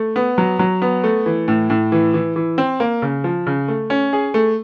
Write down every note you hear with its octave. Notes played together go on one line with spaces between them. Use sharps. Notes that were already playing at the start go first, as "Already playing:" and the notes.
Already playing: A3
B3
F#3
F#3
B3
A3
E3
A2
A2
E3
E3
E3
C4
A#3
C#3
F3
C#3
A3
C#4
G#4
A3